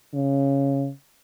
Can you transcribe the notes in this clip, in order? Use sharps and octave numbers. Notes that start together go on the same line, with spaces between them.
C#3